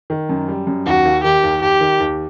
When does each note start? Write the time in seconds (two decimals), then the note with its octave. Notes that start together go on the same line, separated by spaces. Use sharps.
0.10 D#3
0.29 F#2
0.48 G3
0.67 F#2
0.86 D#2 F#4
1.05 D#2
1.24 D#3 G4
1.43 D#2
1.62 D#2 G4
1.81 D#3
2.00 D#2